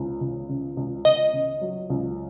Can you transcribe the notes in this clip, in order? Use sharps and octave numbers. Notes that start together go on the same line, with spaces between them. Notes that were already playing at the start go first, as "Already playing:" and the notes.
Already playing: C#2 C#3
C#2
C#3
C#2
C#2 D#5
C#3
F#3
C#2